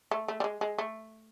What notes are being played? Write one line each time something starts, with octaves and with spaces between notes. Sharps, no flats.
A3
A3
G3
G#3
G#3
A3